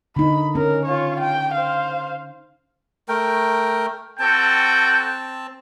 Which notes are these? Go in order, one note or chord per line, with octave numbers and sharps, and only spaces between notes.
D3 D#4 B5
C#4 A#4
F4 C#5
G5
C5 F5
A3 A#4 G5
C4 F#4 A4 G5 A5